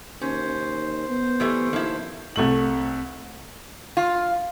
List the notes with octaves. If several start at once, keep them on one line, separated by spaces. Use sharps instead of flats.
D#2 C#4 C5
B3
E3 G3 A3
D#2 F3 E4
C2 A3 F#7
F4